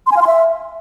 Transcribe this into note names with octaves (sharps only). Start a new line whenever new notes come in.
C6
G#5
F5
C6
E5